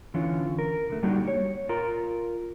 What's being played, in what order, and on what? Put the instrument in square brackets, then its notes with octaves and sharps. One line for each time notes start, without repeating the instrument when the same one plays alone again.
[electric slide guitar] D3 E3 C#4 F4
A#4
D3 A3
G3 A#3 D4 D#4 F#4 G4
C#5
F4 A#4 A#5